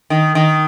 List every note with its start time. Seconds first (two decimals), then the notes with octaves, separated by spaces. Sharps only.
0.10 D#3
0.35 D#3